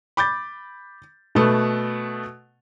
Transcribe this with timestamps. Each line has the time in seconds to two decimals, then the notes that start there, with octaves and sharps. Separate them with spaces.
0.17 B5 D6 G6 A6
1.35 B2 A3 B3